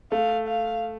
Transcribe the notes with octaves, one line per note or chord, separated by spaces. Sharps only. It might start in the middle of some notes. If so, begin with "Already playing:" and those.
A3 F5
F5